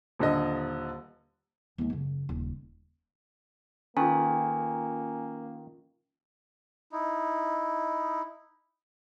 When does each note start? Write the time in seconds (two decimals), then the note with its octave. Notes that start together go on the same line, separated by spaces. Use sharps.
0.19 D#1 D3 D#5
1.78 D#2 G#3
1.90 F#2 C#3
2.29 D#1 C#2
3.97 D#3 A#3 C#4 F4 A4 B4 G#5
6.92 D#4 E4